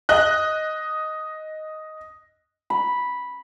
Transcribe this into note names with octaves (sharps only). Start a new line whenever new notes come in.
D#5 F#6
B5